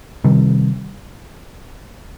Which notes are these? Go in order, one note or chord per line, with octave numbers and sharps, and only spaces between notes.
C3 D#3 G3